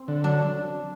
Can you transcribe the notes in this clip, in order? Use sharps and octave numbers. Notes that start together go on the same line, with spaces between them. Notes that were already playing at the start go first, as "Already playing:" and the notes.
Already playing: C4
D3
F#3 D4